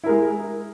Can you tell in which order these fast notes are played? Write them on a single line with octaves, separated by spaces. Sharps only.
E4 A#4 G#3